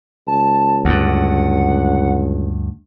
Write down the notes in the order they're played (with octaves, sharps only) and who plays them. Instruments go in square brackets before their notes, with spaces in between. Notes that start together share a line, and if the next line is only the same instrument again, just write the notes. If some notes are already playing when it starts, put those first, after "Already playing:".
[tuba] C#2 [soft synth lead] A5
[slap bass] D2 G2 [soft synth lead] F#5